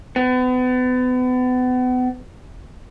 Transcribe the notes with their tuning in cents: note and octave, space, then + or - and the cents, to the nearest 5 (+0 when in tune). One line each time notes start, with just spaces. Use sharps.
B3 +35